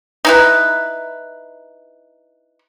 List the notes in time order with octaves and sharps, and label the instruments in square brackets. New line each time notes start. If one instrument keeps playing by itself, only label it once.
[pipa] D#4 E4 B4